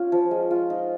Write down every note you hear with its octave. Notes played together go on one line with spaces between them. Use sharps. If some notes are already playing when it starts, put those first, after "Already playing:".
Already playing: C#4 F4
F3
G#3
F4
D#4